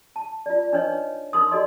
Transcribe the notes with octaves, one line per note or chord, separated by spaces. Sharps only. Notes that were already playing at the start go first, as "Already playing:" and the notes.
A5
F4 D5
D4 D#4 B4 C#5 D#5
D#4 A#4 C6 D#6
F#4 A4 D5 D#5 C6